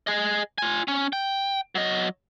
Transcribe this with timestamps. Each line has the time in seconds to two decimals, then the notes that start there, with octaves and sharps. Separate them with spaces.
0.07 G#4 D#5
0.58 F4 G#5
0.88 C#4
1.13 G5
1.75 F#3 D#5